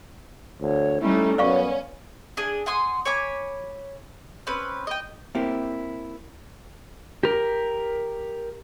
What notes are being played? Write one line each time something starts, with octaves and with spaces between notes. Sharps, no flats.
D2 C#5
G3 A3 C#4 D#4 E4
F#2 B3 C#4 D5 F5 C#6
D4 G#4 G#5
F#5 G#5 C6 D#6
C#5 G#5 B5 D6
C4 C#4 B4
D#5 G5
A#3 C4 E4 G4
G4 A#4